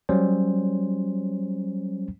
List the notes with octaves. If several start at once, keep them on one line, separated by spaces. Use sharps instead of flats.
F#3 G3 C#4 C5